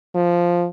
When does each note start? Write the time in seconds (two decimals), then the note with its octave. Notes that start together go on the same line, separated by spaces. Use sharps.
0.15 F3